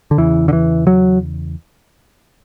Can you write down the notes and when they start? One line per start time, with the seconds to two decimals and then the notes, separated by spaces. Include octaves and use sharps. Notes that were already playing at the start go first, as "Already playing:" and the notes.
0.11 D3
0.18 E2 C#3 E3
0.48 D3
0.53 E3
0.87 F#3